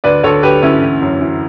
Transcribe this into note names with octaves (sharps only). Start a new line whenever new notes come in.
D2 B4 D5
D2 A4 C#5
D2 G4 B4
D2 C#4 E4
E3
F#2
E3